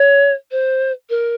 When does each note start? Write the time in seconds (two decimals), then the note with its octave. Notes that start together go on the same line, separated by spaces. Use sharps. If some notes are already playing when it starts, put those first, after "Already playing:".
Already playing: C#5
0.51 C5
1.09 A#4